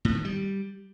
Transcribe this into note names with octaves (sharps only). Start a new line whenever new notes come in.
A2
D#3
G3